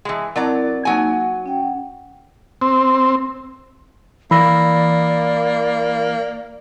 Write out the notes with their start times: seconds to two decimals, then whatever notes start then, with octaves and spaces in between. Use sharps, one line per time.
0.05 E3 G#3
0.36 F#3 C4 E4 A#4 D5 A#5
0.85 F#3 A#3 D#4 G#5
1.12 F#5
1.46 C#4 G5
2.62 C4
4.31 E3 A#3 D5 B5 E6 A#6